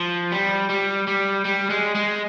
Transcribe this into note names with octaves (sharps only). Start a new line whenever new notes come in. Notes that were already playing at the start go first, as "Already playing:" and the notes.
Already playing: F3
G3
G3
G3
G3
G#3
G#3